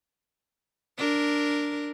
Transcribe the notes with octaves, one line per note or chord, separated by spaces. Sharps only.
D4 A#4